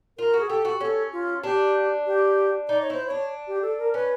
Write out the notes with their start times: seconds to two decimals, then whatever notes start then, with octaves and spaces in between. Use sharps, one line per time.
0.18 F4 A#4
0.34 F#4
0.40 G#4
0.49 G4 A4
0.65 F#4
0.81 C#4 A4
1.13 F4
1.44 D4 G4
2.06 G4
2.68 D#4 D5
2.82 C#5
2.90 E4 C5
3.07 D4 C#5
3.48 G4
3.62 A4
3.79 A#4
3.94 C#4 B4